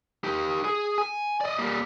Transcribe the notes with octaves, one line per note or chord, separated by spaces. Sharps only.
D#4 G4
G#4
G#5
D5 D#5
G3 A#3